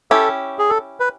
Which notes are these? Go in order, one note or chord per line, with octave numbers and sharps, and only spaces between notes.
C#4 E4 G4 A4
G#4
A4
B4